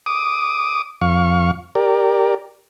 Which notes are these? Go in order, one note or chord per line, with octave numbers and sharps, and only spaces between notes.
D6 D#6
F2 F5 C#6
G4 A#4 D5